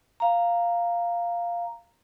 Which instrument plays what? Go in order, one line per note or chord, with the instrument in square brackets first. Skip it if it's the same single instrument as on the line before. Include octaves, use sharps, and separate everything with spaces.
[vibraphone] F5 A#5